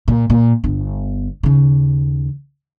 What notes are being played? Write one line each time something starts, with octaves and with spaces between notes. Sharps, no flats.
A#2
A#2
G1 B3
D#2 C#3